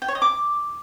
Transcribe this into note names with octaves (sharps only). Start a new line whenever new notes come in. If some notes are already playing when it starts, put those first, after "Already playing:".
G5
C#5
D#5
D6